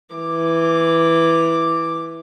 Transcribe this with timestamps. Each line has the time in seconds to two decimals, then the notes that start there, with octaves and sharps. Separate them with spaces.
0.15 E3 D6